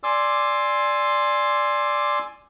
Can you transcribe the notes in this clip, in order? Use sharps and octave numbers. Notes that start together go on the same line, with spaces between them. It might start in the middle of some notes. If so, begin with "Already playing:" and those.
D5 G#5 C6 D6 E6